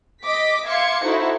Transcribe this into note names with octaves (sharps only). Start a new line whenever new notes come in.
D#5 D6 B6
E5 F5 C6 D6 G#6 C#7
D#4 E4 F#4 A4 C5